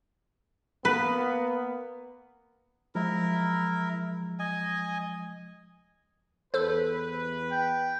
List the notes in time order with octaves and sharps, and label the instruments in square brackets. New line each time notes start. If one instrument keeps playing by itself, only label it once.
[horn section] A#3 B3 [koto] B4
[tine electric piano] F3 G#3 [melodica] E4 A#4
[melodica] D#5 G#5
[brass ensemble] E2 B4 [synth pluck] A4 C5
[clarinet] G5